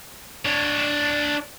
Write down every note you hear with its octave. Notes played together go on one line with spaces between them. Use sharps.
D4 C#5